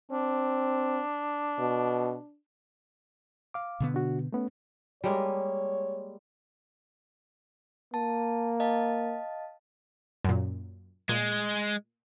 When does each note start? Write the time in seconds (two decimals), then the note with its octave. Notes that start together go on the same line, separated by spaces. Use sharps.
0.11 C4 D4
1.59 B2
3.54 F5 D6
3.80 B2 D3 B3
3.94 D4 F#4
4.32 A3 B3 C#4
5.04 G3 G#3 A#3 C#5
7.94 A#3 A5
8.60 D#5 F5 A5
10.25 F#2 A#2
11.09 A#2 G#3